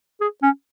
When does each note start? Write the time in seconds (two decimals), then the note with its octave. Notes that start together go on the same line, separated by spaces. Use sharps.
0.21 G#4
0.43 C#4